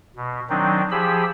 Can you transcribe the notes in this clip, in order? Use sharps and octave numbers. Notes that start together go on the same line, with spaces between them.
B2
D#3 F#3 C4 D4 D#4
F3 G4 G#4 B5 E6